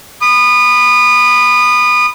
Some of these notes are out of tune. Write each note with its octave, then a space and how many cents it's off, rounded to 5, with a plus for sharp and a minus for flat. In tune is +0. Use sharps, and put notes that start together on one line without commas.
B5 +10 D#6 -25